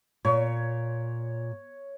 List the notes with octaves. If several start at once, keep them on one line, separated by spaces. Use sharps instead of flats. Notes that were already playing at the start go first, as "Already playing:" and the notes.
A#2 C#5